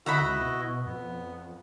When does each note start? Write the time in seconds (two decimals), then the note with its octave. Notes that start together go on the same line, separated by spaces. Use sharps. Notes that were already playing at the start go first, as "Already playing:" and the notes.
0.06 D3 E4 F#4 D#5 E5 F#5 B5
0.20 C#2
0.41 B2
0.85 F2 B3